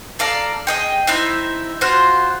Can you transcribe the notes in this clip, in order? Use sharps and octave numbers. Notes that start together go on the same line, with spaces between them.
A4 D5 F5 A#5
G#4 D#5 G5
C4 D#4 E4 E5
F4 F#4 C5